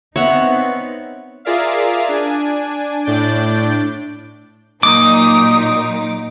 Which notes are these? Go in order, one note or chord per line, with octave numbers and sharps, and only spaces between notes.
B3 C4 D#4 C#5 E5 F#5
F4 G#4 A#4 D5 E5 F5
D4 G#5
A2 D4 D5 G6 A6 D7
A#2 F#3 D#4 D6 D#6